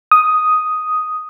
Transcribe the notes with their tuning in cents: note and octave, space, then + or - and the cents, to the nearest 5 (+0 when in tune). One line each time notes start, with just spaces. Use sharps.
D#6 +5